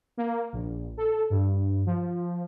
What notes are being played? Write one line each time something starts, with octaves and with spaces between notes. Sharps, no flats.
A#3
A#1
A4
G2
F3